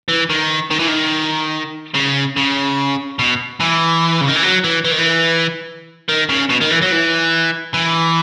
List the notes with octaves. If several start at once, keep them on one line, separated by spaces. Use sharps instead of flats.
E3
D#3
D#3
E3
D#3
C#3
C#3
B2
E3
C#3
D#3
E3
F#3
E3
E3
D#3
E3
D#3
C#3
B2
D#3
E3
F#3
E3
E3